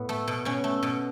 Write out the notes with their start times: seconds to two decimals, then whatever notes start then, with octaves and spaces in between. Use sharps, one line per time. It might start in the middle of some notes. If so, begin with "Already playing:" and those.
Already playing: A2 B3
0.09 A3
0.28 B2
0.45 B2 C#4
0.64 A3
0.83 B2